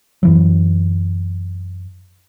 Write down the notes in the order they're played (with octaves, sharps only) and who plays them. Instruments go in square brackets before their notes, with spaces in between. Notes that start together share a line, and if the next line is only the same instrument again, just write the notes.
[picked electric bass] F#2 E3 F#3